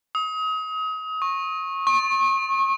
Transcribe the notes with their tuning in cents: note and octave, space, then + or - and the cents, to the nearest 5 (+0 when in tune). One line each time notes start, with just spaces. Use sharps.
D#6 +35
C#6 -25
C#6 -40